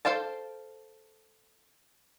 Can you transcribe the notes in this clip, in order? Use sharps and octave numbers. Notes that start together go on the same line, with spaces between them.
A4 C5 F5 G5 A5